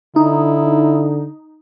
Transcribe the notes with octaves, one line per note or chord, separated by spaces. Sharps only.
D3 D#4 E4